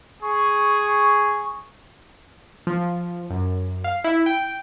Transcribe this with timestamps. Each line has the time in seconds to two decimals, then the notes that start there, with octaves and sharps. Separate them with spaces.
0.22 G#4 C#6
2.67 F3
3.30 F#2
3.84 F5
4.04 E4
4.26 G5